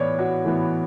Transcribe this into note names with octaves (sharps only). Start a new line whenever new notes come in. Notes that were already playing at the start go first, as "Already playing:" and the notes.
Already playing: A2 E3 B3 C#5 D5
F#4
A2 E3 B3